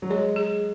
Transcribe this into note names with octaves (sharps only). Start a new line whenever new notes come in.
F#3
G#3 C#5
G#4